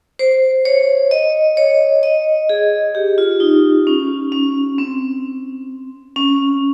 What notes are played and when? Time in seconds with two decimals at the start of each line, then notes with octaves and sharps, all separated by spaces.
0.19 C5
0.65 C#5
1.11 D#5
1.57 C#5
2.03 D#5
2.49 G#4
2.95 G4
3.18 F4
3.40 D#4
3.87 C#4
4.32 C#4
4.78 C4
6.16 C#4